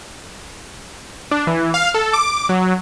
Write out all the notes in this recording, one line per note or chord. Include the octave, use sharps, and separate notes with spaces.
D4
E3
F5
A4
D6
F#3